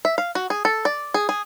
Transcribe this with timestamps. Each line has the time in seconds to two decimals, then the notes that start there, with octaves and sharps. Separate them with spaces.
0.05 E5
0.18 F5
0.35 F#4
0.50 G#4
0.65 A4
0.85 D5
1.14 G#4
1.29 G#4